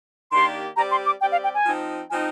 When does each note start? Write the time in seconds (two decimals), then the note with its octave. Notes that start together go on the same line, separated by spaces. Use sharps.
0.32 D#3 A#3 D4 G4 D5 C6
0.76 G3 C4 G4 D5 A#5
0.91 C6
1.06 D6
1.21 G3 C4 G4 D5 G5
1.32 F5
1.44 G5
1.55 G#5
1.65 F3 C4 D#4
2.10 F3 C4 D#4 G#5